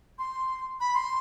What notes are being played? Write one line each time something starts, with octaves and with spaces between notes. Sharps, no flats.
C6
B5
C6